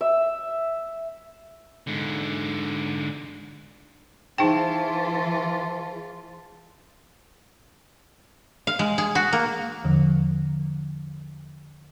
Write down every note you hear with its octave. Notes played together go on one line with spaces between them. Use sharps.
E5
G#2 D3
E3 D#4 F4 G#4 C5 G5 A5
F5
G#3
G#4
F#4
A#3
E2 D3 F3